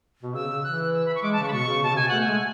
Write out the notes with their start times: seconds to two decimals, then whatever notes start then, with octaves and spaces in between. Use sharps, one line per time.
0.23 B2
0.34 C#3 E6
0.49 C#3
0.64 E3 F#6
0.94 E6
1.06 B5
1.15 C#6
1.23 G#3 D6
1.33 A5
1.38 C#3 C#6
1.48 B5
1.52 B2 C#6
1.68 C#3
1.83 B2 A5
1.90 C#3
1.96 B2 G#5
2.09 A3 F#5
2.21 G#5
2.27 G#3